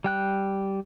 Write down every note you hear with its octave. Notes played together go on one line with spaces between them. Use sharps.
G3 G5 F#6